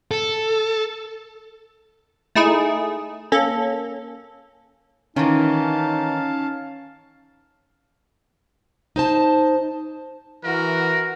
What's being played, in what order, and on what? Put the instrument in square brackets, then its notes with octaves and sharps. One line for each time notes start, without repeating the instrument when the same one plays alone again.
[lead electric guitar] A4
[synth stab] A3 D#4 E4 G#4
A#3 C#4 A4
[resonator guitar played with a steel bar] D#3 E3 [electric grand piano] C#4 [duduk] D#4 [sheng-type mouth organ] F5 A5
[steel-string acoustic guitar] D#4 C5 A5
[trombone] E3 [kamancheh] F#4 [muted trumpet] A#4